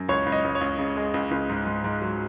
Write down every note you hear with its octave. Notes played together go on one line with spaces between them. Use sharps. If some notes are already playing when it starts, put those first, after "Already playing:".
Already playing: F#2
C#2 C#5
C#2
D#5
C#2
C#5
C#2
C#3
G#3
C#2
C#2
G#2
G#2
G#2
F#3